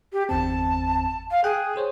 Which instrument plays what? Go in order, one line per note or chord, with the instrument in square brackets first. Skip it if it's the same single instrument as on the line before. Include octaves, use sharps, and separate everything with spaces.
[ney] G4
[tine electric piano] G1 E2 C4 [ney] A5
[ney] F5
[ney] G#4 [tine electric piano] G5 F#6
[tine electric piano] G#4 C5 C#5